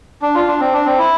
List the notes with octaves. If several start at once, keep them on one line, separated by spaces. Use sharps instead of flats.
D4
F4
D4
C4
D4
C4
E4